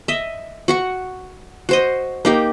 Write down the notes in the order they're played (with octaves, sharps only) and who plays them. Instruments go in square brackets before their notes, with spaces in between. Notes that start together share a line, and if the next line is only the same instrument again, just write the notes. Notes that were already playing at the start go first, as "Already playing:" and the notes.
[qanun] D#5 E5
F#4 F#5 C#6
F#4 C5 D#5
A#3 D#4 G4